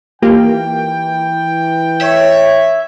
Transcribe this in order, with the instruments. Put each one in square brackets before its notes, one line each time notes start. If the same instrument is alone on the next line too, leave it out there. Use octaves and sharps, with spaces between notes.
[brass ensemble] E3 G5 [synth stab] A#3 F4 G4
[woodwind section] C#5 [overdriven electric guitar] E5